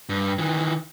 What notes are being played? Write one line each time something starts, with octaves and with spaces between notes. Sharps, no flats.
G2
D#3 E3